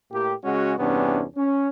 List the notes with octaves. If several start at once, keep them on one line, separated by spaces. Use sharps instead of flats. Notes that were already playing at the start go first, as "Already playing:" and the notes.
A2 A#3 G4
C#3 G#3 C#4 F#4
E2 G2 C3 B3 C#4 D4
C#4